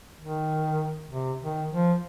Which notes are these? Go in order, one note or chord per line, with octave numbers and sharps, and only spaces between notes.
D#3
C3
D#3
F3